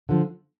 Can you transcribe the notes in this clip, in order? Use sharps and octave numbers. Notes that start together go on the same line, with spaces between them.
D3 F3